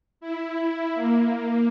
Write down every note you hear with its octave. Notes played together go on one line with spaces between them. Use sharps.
E4
A#3